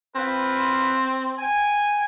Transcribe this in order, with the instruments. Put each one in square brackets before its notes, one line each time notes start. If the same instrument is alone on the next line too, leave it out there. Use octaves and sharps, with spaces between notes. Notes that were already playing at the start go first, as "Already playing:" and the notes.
[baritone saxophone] C4 [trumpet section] F4 B4
[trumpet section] G5 G#5